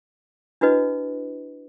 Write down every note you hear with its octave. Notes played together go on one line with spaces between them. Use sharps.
D4 E4 F#4 B4 D#5